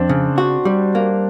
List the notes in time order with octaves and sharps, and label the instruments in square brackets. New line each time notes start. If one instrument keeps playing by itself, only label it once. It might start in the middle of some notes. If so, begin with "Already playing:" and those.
Already playing: [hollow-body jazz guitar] F2 [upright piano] C4 D4
[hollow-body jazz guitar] C#3
F#4
G3
A#3